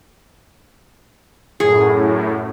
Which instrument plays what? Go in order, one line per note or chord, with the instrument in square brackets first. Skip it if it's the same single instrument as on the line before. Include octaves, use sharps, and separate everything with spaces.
[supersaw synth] F#2 A2 [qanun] G#4